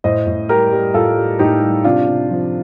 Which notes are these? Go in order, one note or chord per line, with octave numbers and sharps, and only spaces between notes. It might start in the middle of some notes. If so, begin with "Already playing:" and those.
A2 C5 D#5
A2
G3 G4 A#4
G3
A2 F4 A4
G3
A2 D#4 G4
G3
C3 D4 F4
C3
F3